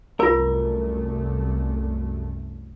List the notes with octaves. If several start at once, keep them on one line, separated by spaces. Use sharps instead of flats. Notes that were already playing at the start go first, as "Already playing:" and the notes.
C2 F#2 A3 F4 A#4 B4